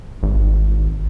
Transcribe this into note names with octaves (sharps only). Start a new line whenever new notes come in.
G#1